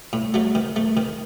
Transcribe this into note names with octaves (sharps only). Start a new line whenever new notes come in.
A2
F#3 A3
D#3
A3
D#3